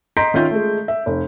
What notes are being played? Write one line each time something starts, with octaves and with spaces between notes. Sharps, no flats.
D#5 A#5 C6 G6 B6 D7
D#3 C#4 F4 E5 G6
G#3 A3
E5
F1